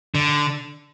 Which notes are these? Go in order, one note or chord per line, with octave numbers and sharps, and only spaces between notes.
D3